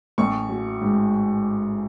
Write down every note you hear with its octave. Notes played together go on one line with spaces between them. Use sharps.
A1 C#6
F#3
G#2